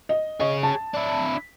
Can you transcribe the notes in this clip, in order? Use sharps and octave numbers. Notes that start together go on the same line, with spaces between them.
D#5
G#4 C#5 D#5
A5
D4 E4